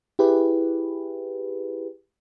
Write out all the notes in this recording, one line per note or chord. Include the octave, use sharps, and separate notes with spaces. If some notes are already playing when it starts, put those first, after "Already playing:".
E4 G4 G#4 B4